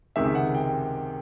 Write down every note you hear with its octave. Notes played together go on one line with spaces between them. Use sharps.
C#2 C3 D#3 G#3 E5
F#5
G5